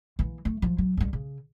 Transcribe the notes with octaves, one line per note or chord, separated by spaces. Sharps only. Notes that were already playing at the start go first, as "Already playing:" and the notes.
E3 A#3
A3
F3 F#3
F#3
C#2 G3
C#3